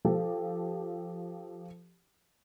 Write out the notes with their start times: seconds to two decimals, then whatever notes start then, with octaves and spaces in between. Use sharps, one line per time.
0.05 F3 G4 A4